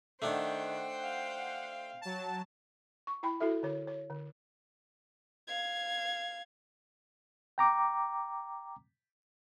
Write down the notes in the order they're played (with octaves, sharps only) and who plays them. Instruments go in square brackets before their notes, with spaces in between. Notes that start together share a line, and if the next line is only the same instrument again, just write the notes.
[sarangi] D#3 [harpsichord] A3 D4 [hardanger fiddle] C5 G5 [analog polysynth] F#5
[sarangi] F5
[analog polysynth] F#3 A5
[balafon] C#6
E4 G5 B5
E4 F#4 A4 E5
D3 C#5
C#5
D3
[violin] F5 G#6
[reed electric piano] G5 A#5 D6